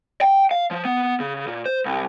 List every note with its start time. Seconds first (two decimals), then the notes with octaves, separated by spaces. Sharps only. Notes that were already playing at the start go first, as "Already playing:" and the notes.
0.21 G5
0.51 F5
0.71 F3
0.85 B3
1.20 C#3
1.47 A#2
1.66 C5
1.86 C2